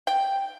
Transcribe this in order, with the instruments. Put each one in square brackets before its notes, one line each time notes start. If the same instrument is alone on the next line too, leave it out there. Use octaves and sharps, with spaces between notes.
[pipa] G5